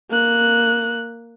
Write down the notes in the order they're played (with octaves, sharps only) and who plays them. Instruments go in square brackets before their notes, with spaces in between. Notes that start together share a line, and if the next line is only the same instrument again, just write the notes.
[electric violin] A#3 F#6